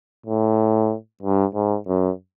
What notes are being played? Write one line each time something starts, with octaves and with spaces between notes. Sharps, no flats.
A2
G2
G#2
F#2